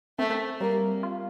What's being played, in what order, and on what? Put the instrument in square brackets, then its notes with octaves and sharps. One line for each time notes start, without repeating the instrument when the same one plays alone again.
[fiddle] A3 [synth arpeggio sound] C4
[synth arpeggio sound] G3 [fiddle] A#3
[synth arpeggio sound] F4